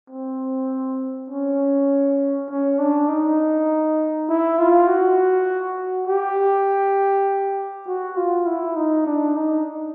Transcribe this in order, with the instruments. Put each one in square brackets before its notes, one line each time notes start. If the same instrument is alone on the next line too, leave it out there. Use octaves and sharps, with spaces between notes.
[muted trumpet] C4
C#4
C#4
D4
D#4
E4
F4
F#4
G4
F#4
F4
E4
D#4
D4
D#4